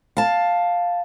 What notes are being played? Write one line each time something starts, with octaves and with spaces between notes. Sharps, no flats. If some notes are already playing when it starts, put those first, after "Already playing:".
F5 A5